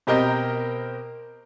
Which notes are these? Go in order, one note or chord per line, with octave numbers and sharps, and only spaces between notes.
B2 C4 G4 A#4 D#5 G6